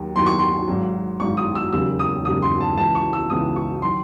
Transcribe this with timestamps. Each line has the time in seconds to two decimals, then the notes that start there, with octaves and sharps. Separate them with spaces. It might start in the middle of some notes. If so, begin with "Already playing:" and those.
Already playing: D#2 D#3 F#3
0.15 D#2 D#3 F#3 C6
0.26 C#6
0.39 C6
0.68 G#1 G#2 F#3
1.20 G#1 G#2 F#3 C#6
1.37 D#6
1.55 E6
1.72 E1 D#2 C#3 F#3 E6
1.99 D#6
2.25 E1 D#2 C#3 F#3 D#6
2.42 C6
2.61 A5
2.77 C#2 C#3 E3 A5
2.95 C#6
3.13 E6
3.30 C#2 C#3 E3 D#6
3.56 C#6
3.82 D#3 F#3 C6